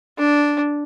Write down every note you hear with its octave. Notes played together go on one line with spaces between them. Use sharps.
D4